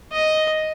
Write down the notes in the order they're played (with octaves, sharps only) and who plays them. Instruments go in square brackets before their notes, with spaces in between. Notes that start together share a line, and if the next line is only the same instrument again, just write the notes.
[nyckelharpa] D#5